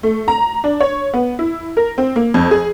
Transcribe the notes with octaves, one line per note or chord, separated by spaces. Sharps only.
A3
A#5
D4
C#5
B3
E4
A#4
C4
A#3
F2
G#4